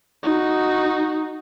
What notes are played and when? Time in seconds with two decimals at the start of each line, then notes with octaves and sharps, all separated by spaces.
0.23 D#4 F#4